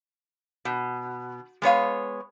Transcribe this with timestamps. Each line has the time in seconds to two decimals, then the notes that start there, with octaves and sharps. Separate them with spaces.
0.65 B2
1.62 G#3 B3 C#5 F5